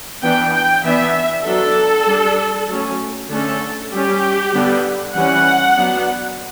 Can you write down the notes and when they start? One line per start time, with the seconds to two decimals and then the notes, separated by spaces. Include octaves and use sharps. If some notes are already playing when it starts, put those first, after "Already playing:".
0.22 E3 B3 D4 G5
0.53 G5
0.83 E3 B3 D4 E5
1.44 F#3 B3 D4 A4
2.06 G3 D4
2.69 F#3 A3 C#4
3.29 D3 A3 C#4 A4
3.92 G3 C#4 G4
4.53 D3 G3 B3 D4
5.15 E3 G3 C#4 F#5
5.76 F#3 B3 D4